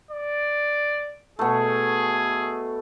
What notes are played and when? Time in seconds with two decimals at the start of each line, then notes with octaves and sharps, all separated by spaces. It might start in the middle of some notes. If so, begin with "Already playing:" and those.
0.11 D5
1.39 B2 A3 G#4